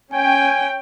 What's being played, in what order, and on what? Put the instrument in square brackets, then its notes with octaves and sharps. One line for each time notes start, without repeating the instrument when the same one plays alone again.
[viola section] C#4 G5 [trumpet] G#5